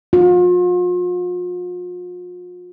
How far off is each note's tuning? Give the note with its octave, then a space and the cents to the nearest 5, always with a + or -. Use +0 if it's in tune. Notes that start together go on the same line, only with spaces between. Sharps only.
F4 +40